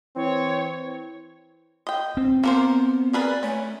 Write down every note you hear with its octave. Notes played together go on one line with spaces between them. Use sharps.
E3 C4 C#5
D#5 G5
C4
A#3 B3 A#4 C5
G#4 A#4 B4 D5
A3 C#4